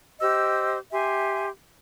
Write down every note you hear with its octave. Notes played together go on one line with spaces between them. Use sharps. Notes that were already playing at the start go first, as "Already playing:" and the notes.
G4 C5 D#5 E6
G4 E5 G#5 C6